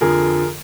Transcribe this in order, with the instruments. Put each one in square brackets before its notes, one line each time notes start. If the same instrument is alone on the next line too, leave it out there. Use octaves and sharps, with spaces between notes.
[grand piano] F2 D3 F3 G#4 A#4